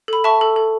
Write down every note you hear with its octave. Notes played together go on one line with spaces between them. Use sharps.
A4 B5
E5 A5 C#6
A4
A4